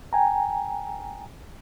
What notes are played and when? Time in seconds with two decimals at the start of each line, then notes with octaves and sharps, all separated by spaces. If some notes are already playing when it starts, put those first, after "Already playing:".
0.13 G5 G#5 A#5